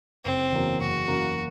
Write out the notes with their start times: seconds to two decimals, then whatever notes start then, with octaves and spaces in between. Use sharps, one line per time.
0.24 F#1 C4
0.52 E2 C#3 F#3 A#3
0.80 F#1 F#4
1.08 E2 C#3 F#3 A#3